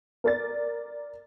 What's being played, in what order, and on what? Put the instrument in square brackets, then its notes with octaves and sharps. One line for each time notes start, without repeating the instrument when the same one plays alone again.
[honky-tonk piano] A#4 D5 A6